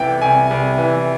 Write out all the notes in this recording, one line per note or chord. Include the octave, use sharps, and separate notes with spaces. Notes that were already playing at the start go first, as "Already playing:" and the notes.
Already playing: C2 C3 E3 G5
C2 G#5
C2
E3